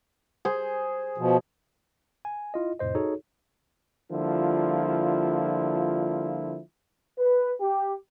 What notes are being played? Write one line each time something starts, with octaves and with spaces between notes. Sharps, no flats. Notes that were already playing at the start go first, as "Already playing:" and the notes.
G#4 C5
B2 F3
G#5
E4 F4 D#5
F2 A2 C3 C5 D#5
D#4 F#4 G#4 A4 C#5
D3 F3 G3 A#3 E4 F4
B4
G4